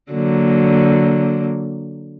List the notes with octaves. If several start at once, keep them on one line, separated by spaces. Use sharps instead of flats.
D3 F#3 A#3